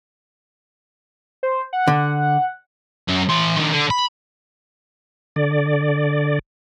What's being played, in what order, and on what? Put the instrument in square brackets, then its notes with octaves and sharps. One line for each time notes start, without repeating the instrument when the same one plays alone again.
[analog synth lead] C5
F#5
[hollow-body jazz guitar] D3
[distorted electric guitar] F#2
E3 C6
D#3 D4
D3
B5
[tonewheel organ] D3 D5